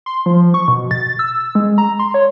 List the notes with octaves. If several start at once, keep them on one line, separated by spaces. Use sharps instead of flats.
C6
F3
C#6
B2
A6
E6
G#3
A#5
C6
C#5